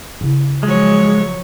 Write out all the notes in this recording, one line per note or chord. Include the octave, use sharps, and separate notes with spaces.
C#3 E4
F3 F#3 G#3 C#5